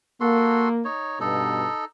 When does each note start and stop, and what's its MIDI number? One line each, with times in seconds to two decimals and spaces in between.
0.21 0.84 58
0.21 0.69 66
0.21 0.69 69
0.21 0.69 84
0.85 1.19 63
0.85 1.19 73
1.20 1.67 43
1.20 1.67 47
1.20 1.85 63
1.20 1.85 69